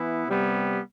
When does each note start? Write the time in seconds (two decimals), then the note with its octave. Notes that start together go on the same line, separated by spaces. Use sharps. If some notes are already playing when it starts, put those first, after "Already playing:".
Already playing: E3 B3 E4
0.27 C3 G3 B3